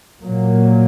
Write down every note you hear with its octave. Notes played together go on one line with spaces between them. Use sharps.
A#2 F#3 A#3